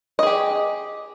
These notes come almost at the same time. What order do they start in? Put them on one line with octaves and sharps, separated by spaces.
D#5 G#4 G4